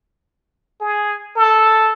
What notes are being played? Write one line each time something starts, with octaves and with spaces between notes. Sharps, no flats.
G#4
A4